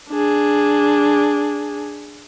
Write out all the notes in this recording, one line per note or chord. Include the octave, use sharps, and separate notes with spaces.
D4 G#4